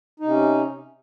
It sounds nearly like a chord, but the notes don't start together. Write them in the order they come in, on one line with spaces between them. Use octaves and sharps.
D#4 C3 C#4